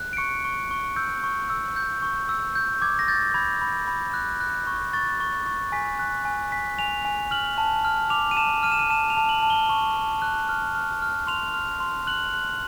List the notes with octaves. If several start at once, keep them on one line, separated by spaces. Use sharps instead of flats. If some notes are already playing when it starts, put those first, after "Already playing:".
Already playing: F#6
D7
C#6 C#7
C#6
C#6
E6 G6
C#6
E6
G6
C#6
E6
G6
D6 G#6
A#6
G6 A6
B5 G#6
B5
B5
F#6
F#6
C#6
C#6 A6
C#6
C#6
G#5 B6
F#6
G#5
G#5 B6
G#5 F7
G#5
F6 F#7
A5
F6
D6 F7
D#7
A5 E7
F6 D#7
E7
D#7
A5 E7
F7
A5
F#7
A5
G7
C#6
A5
F#6
F6
F6
F6
C6 F7
F6
C6
F#6 F#7
F#6